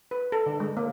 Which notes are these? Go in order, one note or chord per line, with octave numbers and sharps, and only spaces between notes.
B4
A4
D3
G#3
A#3